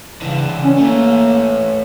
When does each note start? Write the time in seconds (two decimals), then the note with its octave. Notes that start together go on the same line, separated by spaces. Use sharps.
0.22 C#3 E3 D4
0.64 C#4
0.78 A3 A#3 C#4